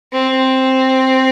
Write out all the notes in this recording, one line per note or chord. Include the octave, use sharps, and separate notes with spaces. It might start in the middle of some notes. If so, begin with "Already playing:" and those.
C4